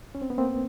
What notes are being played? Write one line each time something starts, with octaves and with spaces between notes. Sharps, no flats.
C#4
C4
B3
A#3 C4